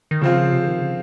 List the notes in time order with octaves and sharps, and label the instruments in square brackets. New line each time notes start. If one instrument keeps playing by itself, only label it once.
[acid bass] D#3
[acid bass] C#3 [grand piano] F3 C4 F4
[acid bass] C3
C#3
D#3
C#3